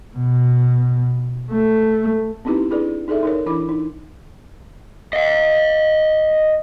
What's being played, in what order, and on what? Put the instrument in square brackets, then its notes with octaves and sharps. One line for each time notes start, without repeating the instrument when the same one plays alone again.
[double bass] B2
A3
[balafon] B3 C4 D#4 E4 G4 B4
D4 E4 G#4 B4 D5
D#4 G#4 A4 D5 E5
D#4 A#4 C#5
E3 D4 E4 B5 D6
D#4
[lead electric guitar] D#5 F5